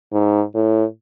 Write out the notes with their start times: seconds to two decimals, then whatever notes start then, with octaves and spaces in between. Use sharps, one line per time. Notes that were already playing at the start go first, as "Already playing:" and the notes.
0.13 G#2
0.54 A2